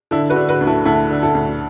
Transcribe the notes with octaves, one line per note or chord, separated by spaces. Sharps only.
D3 E4 A4
F#4 B4
D3
F#4 B4
D2
E4 A4
D2 E4 A4
D3
E4 A4
D2